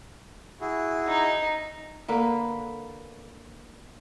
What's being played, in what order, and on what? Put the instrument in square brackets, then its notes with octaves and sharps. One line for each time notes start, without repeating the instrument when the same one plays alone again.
[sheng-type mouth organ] E4 F#4 G#4
[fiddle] D#4
[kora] D3 A#3 B4